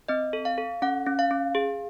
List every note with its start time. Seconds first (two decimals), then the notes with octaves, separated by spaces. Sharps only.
0.08 C4 D#5
0.33 A4
0.45 F5
0.58 A4
0.82 C#4 F#5
1.06 C#4
1.19 F5
1.31 C#4
1.55 G#4